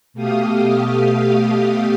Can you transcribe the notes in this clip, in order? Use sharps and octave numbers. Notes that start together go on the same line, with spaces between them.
B2 A3 G4 F5 D#6